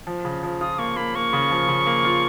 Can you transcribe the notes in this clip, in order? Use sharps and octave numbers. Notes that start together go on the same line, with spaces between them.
F3
C#3
F3
F4 D#6
A#3 C#6
A#3 B5
A#3 C#6
C#3
F3
C#3
A#3
F4